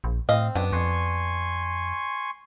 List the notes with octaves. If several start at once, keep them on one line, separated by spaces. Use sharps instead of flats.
A#1
A2 C4 D#5 F5
F#2 B3 D4
F2 G#5 C6 C#6